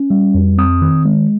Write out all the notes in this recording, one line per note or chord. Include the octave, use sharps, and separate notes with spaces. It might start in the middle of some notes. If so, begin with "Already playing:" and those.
Already playing: C#4
G3
F2
C4 D#6
D#3
G#3